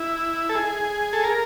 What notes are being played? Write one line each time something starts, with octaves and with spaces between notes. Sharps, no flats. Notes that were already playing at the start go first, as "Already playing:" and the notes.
Already playing: E4
A4
G#4
A4
A#4